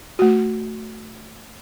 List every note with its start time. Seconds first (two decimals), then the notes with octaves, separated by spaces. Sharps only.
0.19 A3 F#4